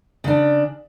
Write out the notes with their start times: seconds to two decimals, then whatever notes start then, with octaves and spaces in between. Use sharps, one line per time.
0.24 C#3 D4